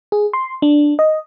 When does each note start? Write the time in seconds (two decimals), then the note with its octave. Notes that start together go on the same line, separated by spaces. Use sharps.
0.12 G#4
0.33 C6
0.62 D4
0.99 D#5